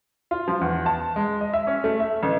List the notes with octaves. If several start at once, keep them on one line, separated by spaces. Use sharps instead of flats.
F4
F3
E2
A5
G#3
D#5
E5
C#4
A3
E5
A1